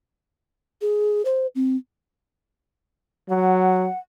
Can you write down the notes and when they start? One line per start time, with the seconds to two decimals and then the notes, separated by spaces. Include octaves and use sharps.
0.82 G#4
1.25 C5
1.55 C4
3.30 F#3 F#5